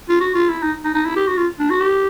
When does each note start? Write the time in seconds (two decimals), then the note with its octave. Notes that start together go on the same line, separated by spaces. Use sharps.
0.09 F4
0.20 F#4
0.35 F4
0.49 E4
0.62 D#4
0.84 D#4
0.94 D#4
1.06 E4
1.16 G4
1.27 F#4
1.37 F4
1.59 D4
1.70 F#4
1.80 G4